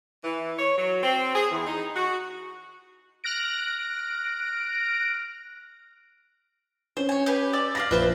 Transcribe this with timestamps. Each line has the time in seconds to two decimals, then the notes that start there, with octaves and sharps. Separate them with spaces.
0.23 E3
0.57 C#5
0.78 F#3
1.02 C4
1.34 G#4
1.51 E2
1.66 D#4
1.96 F#4
3.24 F6 F#6 A#6 D7
6.97 C#4 C5
7.09 C#5 G#5
7.26 G4 B4 G#5
7.53 D5 D6 E6
7.75 G4 D5 F5 A6 A#6
7.91 A#1 B4 C5 E5